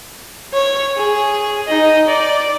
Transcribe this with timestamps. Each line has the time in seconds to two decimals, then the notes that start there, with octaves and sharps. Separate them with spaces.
0.54 C#5
0.98 G#4
1.68 D#4 D#5
2.07 D5